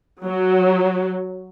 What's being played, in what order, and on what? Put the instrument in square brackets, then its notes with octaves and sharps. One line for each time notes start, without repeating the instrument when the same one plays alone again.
[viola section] F#3